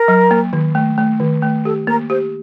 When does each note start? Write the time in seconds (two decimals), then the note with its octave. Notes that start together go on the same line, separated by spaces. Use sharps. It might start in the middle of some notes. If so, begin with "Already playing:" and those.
Already playing: A#4
0.08 F#3
0.31 A#3
0.53 D#3
0.75 A3
0.98 A3
1.20 D#3
1.42 A3
1.65 G4 A4
1.87 A#3 A#4
2.10 G4 C5